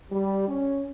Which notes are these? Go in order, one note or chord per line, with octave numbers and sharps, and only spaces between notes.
G3
C#4